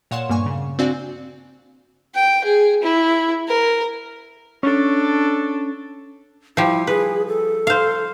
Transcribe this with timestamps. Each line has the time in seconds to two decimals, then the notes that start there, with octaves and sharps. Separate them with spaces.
0.11 A#2 C#5 F5 F#5 C6 E7
0.29 G2 A#3 G#5 C#6
0.46 C#3
0.79 C4 D4 F#4 D5 F5 G#5
2.15 G5
2.45 G#4
2.83 E4
3.48 A#4
4.63 C#4 D4 A4
6.57 F3 G3 E4
6.87 G#4 B4
7.27 A4
7.67 C5 F5